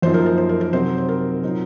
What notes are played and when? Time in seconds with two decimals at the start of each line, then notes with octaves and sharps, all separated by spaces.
0.02 F#2 F3 A#3 D#4 C5
0.14 A#4
0.26 A#4
0.38 C5
0.49 A#4
0.61 A#4
0.73 C3 F#3 C4 D#4 C5
0.98 C5
1.09 A#4
1.43 A#2 F#3 C4 D#4